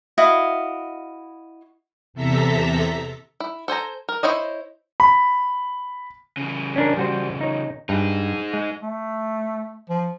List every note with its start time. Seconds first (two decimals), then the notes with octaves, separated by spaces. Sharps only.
0.18 E4 F#4 D#5 F5
2.14 E2 C3 A4 E5 A#5 B6
3.40 E4
3.68 A4 C5 G#5 A#5
4.09 A#4
4.23 E4 C5 C#5 D#5
5.00 B5
6.37 C#3 E3
6.76 C#4 D4 A#4
6.97 G3 F#4 C5
7.41 D#4 C#5
7.89 G2 D#4 G#4
8.54 G#3
8.83 A3
9.90 F3